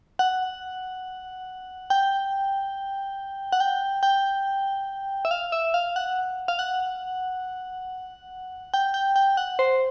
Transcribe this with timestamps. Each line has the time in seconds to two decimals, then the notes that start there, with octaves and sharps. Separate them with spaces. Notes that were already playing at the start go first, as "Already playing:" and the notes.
0.19 F#5
1.90 G5
3.52 F#5
3.60 G5
4.03 G5
5.25 E5
5.31 F5
5.52 E5
5.74 F5
5.96 F#5
6.48 F5
6.59 F#5
8.74 G5
8.94 G5
9.16 G5
9.37 F#5
9.59 C5